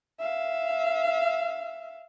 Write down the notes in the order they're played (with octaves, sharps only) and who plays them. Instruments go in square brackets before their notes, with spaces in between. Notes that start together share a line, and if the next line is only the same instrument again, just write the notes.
[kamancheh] E5 F5